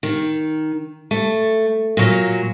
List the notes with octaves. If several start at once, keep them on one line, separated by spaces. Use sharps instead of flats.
D#3
A3
A#2 F#3